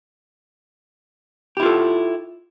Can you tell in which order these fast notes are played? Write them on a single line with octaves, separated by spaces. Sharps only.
G4 E4 F4 A4